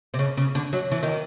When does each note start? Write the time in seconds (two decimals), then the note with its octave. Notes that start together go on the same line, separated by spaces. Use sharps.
0.14 C3
0.19 C#3
0.37 C#3
0.55 D3
0.73 F#3
0.92 E3
1.03 D#3